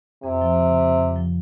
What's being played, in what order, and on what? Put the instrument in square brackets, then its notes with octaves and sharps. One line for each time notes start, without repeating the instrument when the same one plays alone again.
[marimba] F2 [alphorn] C3
[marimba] F3
C#3
F2
F2
F3